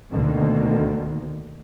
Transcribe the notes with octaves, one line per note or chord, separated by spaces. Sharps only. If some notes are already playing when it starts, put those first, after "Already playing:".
D2 B2 D3 D#3 A#3